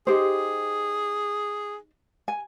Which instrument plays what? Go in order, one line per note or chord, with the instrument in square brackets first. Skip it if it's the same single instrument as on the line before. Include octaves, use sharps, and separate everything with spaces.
[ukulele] D#4 G4 C5 [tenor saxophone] G#4
[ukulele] G#5